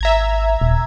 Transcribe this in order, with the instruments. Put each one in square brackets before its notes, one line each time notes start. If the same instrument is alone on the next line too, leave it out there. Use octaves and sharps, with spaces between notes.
[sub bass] G#1 [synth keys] E5 A#5 G#6
[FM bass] D#1